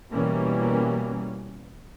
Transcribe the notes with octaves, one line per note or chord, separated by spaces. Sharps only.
B2 E3 G3 A#3 C#4